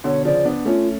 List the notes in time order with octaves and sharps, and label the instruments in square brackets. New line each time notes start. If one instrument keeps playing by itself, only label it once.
[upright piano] B2 D3 [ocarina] C#5
[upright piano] C#3 F3 [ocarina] D5
[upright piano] B3 D4
[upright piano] A3 C#4 [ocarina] F4